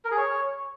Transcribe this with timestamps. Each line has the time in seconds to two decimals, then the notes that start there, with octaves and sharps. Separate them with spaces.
0.05 A#4
0.11 G#4
0.17 C#5